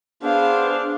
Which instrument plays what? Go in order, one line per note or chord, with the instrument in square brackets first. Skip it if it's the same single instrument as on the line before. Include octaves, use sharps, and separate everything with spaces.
[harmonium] B3 G#4 C5 [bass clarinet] D4 [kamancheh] F5